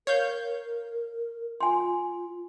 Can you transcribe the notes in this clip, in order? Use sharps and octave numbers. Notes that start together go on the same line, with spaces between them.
A#4 C#5 F5 G6
F4 G#5 C6